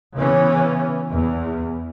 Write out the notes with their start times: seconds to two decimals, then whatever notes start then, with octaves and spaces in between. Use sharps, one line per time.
0.15 C#3 E3 B3 C#4
1.10 E2